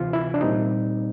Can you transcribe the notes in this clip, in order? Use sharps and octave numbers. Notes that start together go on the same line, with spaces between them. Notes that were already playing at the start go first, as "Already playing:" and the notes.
Already playing: D2 C3 E3 F4
E4
D4
A#2 G3 C4 D#4